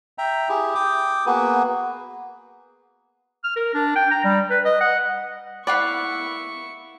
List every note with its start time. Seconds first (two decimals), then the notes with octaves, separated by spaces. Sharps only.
0.18 E5 G5 A#5
0.49 E4 G4 G#4
0.75 G5 D6 D#6
1.26 A#3 B3 F#4 G#4 B4
3.44 F6
3.56 A#4
3.74 D4
3.96 G5
4.11 A#5
4.24 G3
4.50 B4
4.65 D#5
4.81 F#5
5.67 E4 D5 F5 F#5 B5 C#6